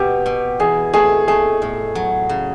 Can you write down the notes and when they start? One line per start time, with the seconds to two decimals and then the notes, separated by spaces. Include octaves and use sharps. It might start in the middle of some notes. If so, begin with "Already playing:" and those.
Already playing: B2 G4
0.26 B2
0.60 E3 G#4
0.93 A3 G#4
1.28 A3 G#4
1.62 A2
1.95 F#3
2.29 C#3